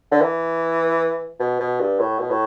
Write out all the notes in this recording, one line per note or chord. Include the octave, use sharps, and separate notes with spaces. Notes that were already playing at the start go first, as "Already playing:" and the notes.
D3
E3
B2
B2
G2
A2
B2
A2